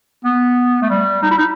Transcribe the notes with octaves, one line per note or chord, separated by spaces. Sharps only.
B3
A3
G3
D#4
E4
D#4